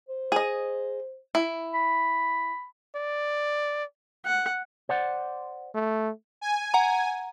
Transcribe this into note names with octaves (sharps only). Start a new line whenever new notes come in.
C5
G#4 D#5
E4
B5
D5
F#5
C5 D5 F#5
A3
G#5
F#5 A#5